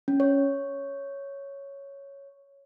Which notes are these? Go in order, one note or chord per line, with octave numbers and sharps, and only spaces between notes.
C#4
C#5